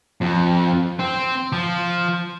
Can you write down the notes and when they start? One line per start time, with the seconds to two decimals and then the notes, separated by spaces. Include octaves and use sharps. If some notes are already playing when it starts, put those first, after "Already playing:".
0.21 F2
1.00 C4
1.53 F3